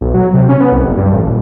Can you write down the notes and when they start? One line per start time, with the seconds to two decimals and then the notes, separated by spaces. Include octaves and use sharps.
0.01 B1
0.14 F#3
0.34 C3
0.49 C#4
0.60 B3
0.72 C2
0.84 F#1
0.97 G2
1.13 A1
1.26 D#1